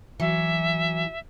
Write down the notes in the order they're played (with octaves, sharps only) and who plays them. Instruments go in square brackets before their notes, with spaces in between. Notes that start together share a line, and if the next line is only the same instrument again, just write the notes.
[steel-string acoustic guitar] E3 F#3 [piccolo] E5